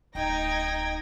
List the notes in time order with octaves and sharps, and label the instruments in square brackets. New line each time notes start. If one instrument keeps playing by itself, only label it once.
[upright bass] D1 [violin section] D#4 [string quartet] D#5 G#6 A#6 [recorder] G5